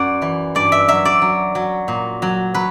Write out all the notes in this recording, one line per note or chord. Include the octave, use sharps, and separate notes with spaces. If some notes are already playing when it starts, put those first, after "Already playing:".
Already playing: F#2 D5 F#5
E3
G2 D5
E5
F#3 E5
D5
F#3
F#3
A#2
F#3
F#3 B4